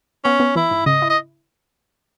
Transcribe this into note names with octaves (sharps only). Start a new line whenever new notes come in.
B3 C#4
B3
E3 E4
G#2
C#3 D#5
E4
D#5